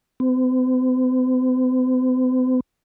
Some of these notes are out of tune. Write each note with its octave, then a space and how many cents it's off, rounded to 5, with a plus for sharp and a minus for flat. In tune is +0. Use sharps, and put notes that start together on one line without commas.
C4 -45